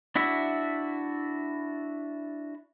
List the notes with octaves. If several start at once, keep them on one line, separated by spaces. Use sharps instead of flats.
D4 E4 F#4 E5